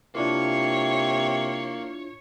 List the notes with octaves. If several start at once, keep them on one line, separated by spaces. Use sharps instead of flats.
C3 A#3 D4 E4 F4 C#5